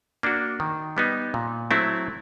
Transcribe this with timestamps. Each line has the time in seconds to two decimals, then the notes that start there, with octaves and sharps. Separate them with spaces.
0.23 A#3 D4 F#4
0.60 D#3
0.97 G3 B3 D#4
1.34 A#2
1.71 F#3 A3 C4 E4